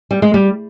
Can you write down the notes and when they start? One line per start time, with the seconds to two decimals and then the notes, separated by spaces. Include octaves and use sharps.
0.11 G3
0.22 G#3
0.34 G3